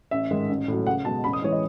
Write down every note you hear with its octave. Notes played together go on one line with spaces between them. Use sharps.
A1 E5
G#2 D#3 G#3
A1
A2 F#3
C#2 F#5
B2 G#3 A5
A1 B5
D#6
E3 G#3 C#5
D#5